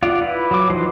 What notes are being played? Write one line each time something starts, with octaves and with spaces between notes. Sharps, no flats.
F4 D5 F5 F#5
E4 B4
F#3 D6
E3 F3 D#4 F#4 C5